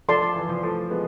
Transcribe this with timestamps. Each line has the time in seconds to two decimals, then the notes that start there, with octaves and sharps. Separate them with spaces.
0.08 F3 A4 D5 A5 C6
0.22 F3
0.36 E3
0.49 F3
0.63 F3 A3
0.90 G#3 B3